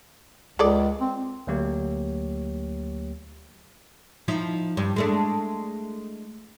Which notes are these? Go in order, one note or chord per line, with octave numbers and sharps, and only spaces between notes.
C#2 G#4 A4 D5
C4
D2 F#3 A#3 G4 C#5
F3 D#4 E4
G2
G#3 A3 D4